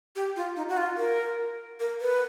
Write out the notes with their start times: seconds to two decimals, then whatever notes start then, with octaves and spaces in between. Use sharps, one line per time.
0.16 G4
0.36 F4
0.56 D#4
0.69 F#4
0.77 F4
0.97 A#4
1.80 A#4
2.01 B4